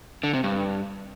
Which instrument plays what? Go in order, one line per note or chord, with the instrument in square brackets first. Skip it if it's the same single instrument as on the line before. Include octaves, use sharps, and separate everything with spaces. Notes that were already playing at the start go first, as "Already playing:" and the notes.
[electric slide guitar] D3
C3
G2